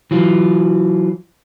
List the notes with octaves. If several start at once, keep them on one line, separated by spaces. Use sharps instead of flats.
E3 F#3 F4